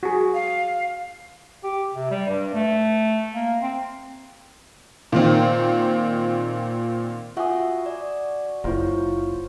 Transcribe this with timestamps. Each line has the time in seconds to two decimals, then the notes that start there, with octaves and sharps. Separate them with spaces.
0.03 F#4 G#4
0.34 F5
1.63 G4
1.94 C3
2.10 G3
2.29 G2
2.54 A3
3.34 A#3
3.62 C4
5.12 A#2 D#3 C4
7.37 F4 F#4 E5 F#5 G#5 D#6
7.86 D5
8.64 F#1 E4 F4 C5 C#5